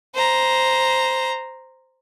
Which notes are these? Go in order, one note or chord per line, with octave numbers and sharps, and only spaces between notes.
C5 A#5